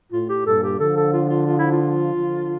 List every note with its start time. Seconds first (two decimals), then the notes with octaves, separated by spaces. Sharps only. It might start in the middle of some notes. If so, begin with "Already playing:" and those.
0.12 A2 F4
0.29 G4
0.46 G2 A#2 A4
0.63 G4
0.80 D3 F3 A4
0.96 A4
1.13 F4
1.30 F4
1.47 F4
1.59 E4
1.71 F4
2.14 D3 F3